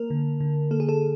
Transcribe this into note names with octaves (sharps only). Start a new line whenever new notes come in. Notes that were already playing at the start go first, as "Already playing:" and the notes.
Already playing: A#3 A#4
D3
D3
A#3 A4
G#4
A4